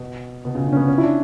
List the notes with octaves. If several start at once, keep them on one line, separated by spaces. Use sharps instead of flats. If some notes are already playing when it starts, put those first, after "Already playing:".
Already playing: B2
B2
C#3
D3
C#4
B3
C#4
E4
D4